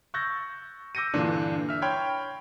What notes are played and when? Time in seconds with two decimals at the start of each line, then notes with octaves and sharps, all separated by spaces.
0.14 C#6 E6 F#6 G6 A6 A#6
0.95 D6 E6 G6 A#6 C#7 D#7
1.14 G2 A#2 D3 E3 D4
1.69 E5 F6
1.82 C#5 G5 B5 C6 F6 G#6